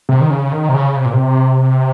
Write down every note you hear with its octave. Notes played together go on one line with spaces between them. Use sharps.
C3
D#3
C#3
D#3
C3
C#3
C3
A#2
C3